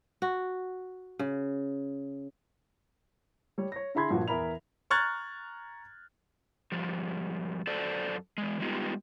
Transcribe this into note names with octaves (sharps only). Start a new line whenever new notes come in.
F#4
C#3
G3 C#5
C#5 A#6
D3 E4 G#4 B5 C6 G#6
G2 A#2 F3 F#4 F#5
E2 A#4 E5 B5 F7
A#5 C#6 F6 F#6 G#6 A6
G#2 F3 G3
F#2 A4 C5 D5 A5
E3 G#3
G3 G#3 B3 D#4 F4 G4